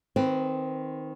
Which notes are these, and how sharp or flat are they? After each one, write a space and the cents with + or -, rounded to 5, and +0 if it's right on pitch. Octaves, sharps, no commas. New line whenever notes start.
D#3 +10 C4 +0 B4 +20